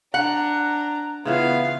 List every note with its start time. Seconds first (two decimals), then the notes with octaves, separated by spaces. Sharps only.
0.14 D4 F#5 A#5
1.25 C#3 E3 B3 C#4 F4 F5